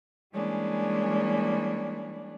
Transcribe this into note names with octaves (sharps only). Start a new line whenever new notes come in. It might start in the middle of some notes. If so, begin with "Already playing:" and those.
E3 G3 G#3 A#3 C#4 D4